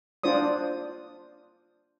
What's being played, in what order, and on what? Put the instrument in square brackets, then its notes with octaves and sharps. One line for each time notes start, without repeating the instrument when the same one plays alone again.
[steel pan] D4 F4 C5 D5 D#6